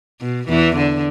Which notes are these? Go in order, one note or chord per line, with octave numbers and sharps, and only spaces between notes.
B2
E2 E3
D3